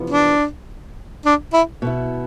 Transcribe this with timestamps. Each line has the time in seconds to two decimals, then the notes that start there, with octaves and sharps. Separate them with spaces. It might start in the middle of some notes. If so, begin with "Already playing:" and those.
Already playing: E2 C3 F3 B3
0.10 D4
1.25 D4
1.53 E4
1.82 B2 B3 E4